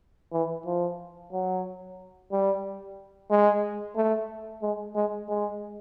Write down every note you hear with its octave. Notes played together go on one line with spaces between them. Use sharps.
E3
F3
F#3
G3
G#3
A3
G#3
G#3
G#3